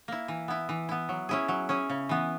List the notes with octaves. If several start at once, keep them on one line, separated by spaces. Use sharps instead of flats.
A#3 E4
E3
B3 E4
E3
B3 E4
F#3
C#4 E4 G#4
F#3
C#4 E4 G#4
C#3
E3 B3